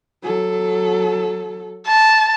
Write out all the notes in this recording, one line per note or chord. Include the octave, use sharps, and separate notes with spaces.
F#3 A4
A5